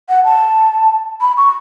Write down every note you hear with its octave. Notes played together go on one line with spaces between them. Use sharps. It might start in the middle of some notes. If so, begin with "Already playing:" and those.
F#5
A5
B5
C#6